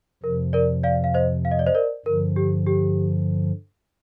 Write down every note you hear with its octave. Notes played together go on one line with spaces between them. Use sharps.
F2 C3 F3 A#4
A#4 D5
D5 F5
F5
C5 D#5
F5
D#5
D5
C5 D#5
A#4 D5
G2 D3 F3 A#4
G4
G4